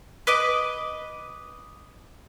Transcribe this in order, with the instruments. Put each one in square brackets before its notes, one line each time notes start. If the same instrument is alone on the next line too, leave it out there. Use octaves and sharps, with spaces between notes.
[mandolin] B4 D#5 D6